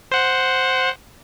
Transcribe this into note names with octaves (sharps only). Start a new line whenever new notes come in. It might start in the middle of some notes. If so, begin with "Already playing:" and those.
C5 F#5